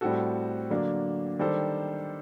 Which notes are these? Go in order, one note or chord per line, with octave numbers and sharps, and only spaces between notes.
A2 G3 C4 F#4 A4
D3 F#3 A#3 D4
D#3 G3 D4 A4 C5